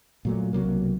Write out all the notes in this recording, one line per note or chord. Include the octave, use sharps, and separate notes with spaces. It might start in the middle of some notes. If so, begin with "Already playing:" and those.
A#2 F#3 A3
B1 C3 F#3 A#3